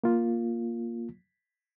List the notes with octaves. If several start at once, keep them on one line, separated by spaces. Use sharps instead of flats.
A#3 F4